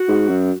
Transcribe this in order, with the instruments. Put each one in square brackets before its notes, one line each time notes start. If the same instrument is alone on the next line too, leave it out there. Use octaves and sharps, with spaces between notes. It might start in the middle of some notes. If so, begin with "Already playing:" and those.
Already playing: [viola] F#4
[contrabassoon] G#2
F#2